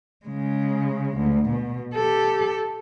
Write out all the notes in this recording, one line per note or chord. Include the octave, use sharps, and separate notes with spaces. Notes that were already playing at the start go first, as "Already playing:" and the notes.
C#3 G#3
D2
B2
G4 A4